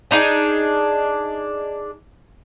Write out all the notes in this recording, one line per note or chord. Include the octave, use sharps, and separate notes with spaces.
D4 D#4 F4 G#4